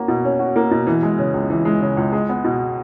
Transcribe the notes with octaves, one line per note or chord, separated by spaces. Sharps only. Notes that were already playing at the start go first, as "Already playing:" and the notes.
Already playing: A#3 C#4 F#4
B2
C#4
F#4
A#3
B2
E3
G#3
C#3
C#2
E3
G#3
C#3
C#2
G#3
B3
B2